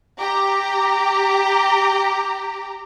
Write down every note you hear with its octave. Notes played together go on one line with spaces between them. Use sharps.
G4 A#5